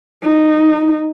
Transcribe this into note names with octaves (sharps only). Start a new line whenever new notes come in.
D#4